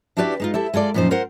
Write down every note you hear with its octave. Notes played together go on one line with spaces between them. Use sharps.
D4 E4 F#4 G4 B4 D5
G#3 D#4 F4
E4 G4 A4
G#3 F4 A4 D5
F#2 A#2 F3 D#4 C5
F4 A#4 C5 F#5